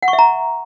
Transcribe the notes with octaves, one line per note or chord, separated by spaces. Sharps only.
F#5
C#6
E5
A#5